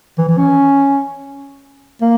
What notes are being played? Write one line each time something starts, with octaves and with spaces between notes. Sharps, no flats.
E3
E3
C#4
A#3